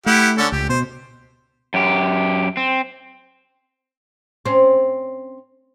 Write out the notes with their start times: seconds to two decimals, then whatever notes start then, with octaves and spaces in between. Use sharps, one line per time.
0.06 A3 E4 G4 F#5
0.38 D3 C#4 A4
0.52 C#2 G4
0.69 B2 C5
1.74 F#2 G4
2.57 C4
4.46 C4 C#4